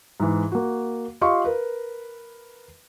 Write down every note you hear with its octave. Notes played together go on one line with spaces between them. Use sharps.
G#2 E3
A#3 F#4
F4 G4 D#5 F5 C6 C#6
A#4 B4